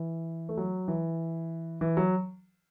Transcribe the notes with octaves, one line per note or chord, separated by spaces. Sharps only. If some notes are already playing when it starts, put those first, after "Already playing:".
Already playing: E3
A3
F#3
E3
E3
F#3